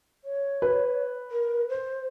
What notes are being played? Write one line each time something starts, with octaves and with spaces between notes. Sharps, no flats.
C#5
B4
A#4
C5